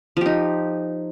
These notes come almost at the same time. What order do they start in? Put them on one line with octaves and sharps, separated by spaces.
F3 G4 D#4